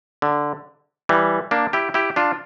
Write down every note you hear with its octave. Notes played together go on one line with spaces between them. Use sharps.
D3
E3 G3
A#3 D4
E4 G4
E4 G4
D4 F4